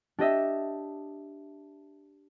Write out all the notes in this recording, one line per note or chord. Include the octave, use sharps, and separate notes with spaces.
D4 G4 D#5 E5